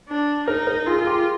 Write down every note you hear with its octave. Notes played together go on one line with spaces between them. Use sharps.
D4
D#4 A#4
A#4
F4 G#4
G#4
G4